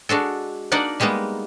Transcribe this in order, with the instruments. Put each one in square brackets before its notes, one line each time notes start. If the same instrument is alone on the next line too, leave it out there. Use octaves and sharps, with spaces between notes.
[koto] G#3 D4 F#4 A4
A#3 D4 D#4 D5 F#5
G3 G#3 A#3 B3 D#4